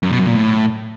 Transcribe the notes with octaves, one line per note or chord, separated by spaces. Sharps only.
F#2
B2
F#2
A#2
A2